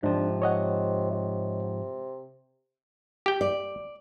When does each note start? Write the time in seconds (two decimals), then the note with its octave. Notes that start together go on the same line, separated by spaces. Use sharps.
0.03 G#2 C3 F3 D4
0.42 C#5 D#5 F#5
1.11 C3
3.26 G4 G5
3.41 D5